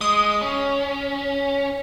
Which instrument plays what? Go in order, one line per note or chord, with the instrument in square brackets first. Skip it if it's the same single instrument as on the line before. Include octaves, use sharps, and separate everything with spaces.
[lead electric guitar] G#3 [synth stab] D#6
[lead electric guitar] C#4